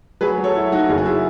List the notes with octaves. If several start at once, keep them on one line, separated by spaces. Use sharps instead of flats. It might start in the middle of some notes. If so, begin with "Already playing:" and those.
F#3 G#4 B4
F#3
A4 C#5
F#3 E4
F#3 D#4 F#4
F#1 G#4
F#4
E4 G#4